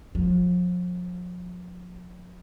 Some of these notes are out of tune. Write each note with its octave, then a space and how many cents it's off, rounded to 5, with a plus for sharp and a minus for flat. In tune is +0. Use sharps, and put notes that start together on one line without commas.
F3 +40